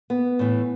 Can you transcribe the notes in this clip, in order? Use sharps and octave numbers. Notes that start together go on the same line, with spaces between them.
B3
A2 E3